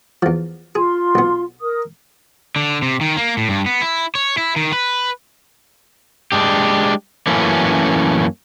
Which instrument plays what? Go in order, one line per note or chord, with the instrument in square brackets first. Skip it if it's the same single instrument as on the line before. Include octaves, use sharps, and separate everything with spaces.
[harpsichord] E2 F3
[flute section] F4 C6 [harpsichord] G#4
[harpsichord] B1 B3
[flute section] A#4 D#6
[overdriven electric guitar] D3
C3
D#3
A#3
A2
G2
B3
E4
C#5
E4
D#3
B4
[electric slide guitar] G#3 D4 G4
F#2 E3 A3 A#3 C#4